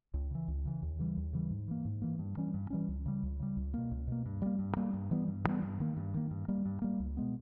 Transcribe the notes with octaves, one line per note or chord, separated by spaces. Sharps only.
C#2
C#3 E3
C#2
C#3 E3
D#2
C#3 E3 G3
D#2
C#3 E3 G3
G#2
E3 A#3
G#2
E3 A#3
G2
E3 G3 C#4
G2
E3 G3 C#4
C#2
C#3 G3
C#2
C#3 G3
C#2
B2 A#3
C#2
B2 A#3
G2
G3 A#3
G2
G3 A#3
G2
E3 G3 B3
G2
E3 G3 B3
G2
D#3 A#3
G2
D#3 A#3
G2
G3 A#3
G2
G3 A#3
C#2
B2 G#3 B3